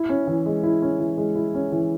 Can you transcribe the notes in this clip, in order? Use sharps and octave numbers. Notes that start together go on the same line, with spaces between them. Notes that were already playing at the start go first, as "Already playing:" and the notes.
Already playing: E4
C#4
E3
G#3
E4
C#4
E3
G#3
E4
C#4
E3